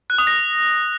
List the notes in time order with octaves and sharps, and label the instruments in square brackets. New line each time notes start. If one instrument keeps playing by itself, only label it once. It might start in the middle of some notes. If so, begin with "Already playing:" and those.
[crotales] F#6
D#6
A#6